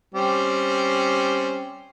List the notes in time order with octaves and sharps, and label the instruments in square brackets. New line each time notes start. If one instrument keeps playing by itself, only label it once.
[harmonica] G3 C4 C#4